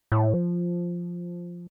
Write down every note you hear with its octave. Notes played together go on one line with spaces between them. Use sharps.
A2
F3